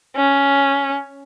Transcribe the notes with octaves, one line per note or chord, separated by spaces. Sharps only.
C#4